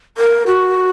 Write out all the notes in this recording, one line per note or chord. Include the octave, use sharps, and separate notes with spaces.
A#4
F#4